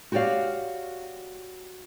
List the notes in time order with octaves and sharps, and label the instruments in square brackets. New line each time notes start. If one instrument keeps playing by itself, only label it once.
[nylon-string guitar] F#4 G4 C#5 D5 F5